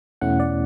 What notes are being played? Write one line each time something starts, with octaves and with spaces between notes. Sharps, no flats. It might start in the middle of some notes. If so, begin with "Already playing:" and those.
E2 B2 A3 C#4 E4 F#5
D5